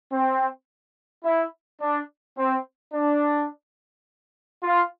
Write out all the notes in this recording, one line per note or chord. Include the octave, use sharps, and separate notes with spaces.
C4
E4
D4
C4
D4
F4